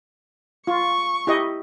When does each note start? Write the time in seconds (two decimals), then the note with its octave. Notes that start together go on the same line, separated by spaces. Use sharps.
0.67 F4 C#6
1.27 E4 G4 D#5